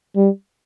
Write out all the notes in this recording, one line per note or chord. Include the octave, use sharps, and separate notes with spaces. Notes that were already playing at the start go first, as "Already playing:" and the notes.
G3